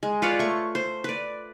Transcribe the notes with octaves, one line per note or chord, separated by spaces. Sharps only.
G#3
F4 B4 C#5 D5
A3 C#6
C5
B4 D5